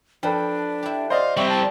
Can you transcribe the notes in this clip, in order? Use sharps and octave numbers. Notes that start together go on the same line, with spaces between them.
F3 D4 A4 B4 G5
E4 G4
C5 D5 D#5 F5
G3 C4 G4 E5 C#6
A5